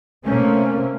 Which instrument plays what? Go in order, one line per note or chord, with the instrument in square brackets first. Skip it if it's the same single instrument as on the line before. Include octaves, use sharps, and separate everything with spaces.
[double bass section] C3 A3 A#3 C4 C#4